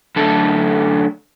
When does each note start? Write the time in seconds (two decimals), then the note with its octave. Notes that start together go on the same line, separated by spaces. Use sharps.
0.16 F#2 D3 A3 D4 A4